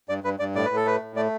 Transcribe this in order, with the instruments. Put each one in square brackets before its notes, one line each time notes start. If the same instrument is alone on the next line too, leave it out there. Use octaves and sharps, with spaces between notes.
[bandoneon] G2 D5
G2 B4
G2 D5
A2 D5
B4
A2
A4
A3 B4
A2
A3 D5